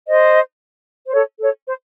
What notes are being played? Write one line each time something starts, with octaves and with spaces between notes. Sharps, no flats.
C5 D#5
C5
A4 C#5
A4 C#5
C5